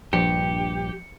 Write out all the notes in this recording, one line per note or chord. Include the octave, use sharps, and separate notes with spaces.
A#1 G2 F3 G4 C#7